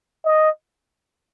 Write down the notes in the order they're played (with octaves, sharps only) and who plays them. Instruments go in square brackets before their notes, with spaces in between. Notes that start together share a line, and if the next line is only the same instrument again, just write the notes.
[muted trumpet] D#5